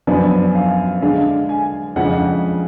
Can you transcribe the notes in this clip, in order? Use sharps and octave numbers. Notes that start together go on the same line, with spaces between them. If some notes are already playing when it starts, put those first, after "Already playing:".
F#2 F3 B3 D4 D5
F5
D3 G#3 D4 F5
G#5
F2 C#3 G#3 D4 F#5